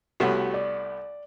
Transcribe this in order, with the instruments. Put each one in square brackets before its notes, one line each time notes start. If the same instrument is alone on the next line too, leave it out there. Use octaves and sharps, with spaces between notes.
[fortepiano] C2 A3 B3 [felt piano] F#4 G4 C#5
[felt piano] D5